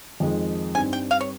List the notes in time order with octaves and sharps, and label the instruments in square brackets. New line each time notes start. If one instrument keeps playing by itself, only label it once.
[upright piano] F2 D#3 G#3
[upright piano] G2 G3 C4 D#4 [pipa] G#5
[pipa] G5
F5
C#5